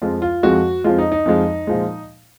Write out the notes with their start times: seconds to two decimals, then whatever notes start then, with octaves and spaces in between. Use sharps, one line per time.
0.02 F2 F3 G#3 F4
0.22 F4
0.43 F2 F3 G#3 F#4
0.84 F2 F3 G#3 F4
0.98 D#4
1.12 D#4
1.26 F2 F3 G#3
1.67 A#2 F3 G#3